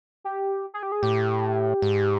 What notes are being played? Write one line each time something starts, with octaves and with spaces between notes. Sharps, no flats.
G4
G#4
G4
G#4
A2 G4
G#2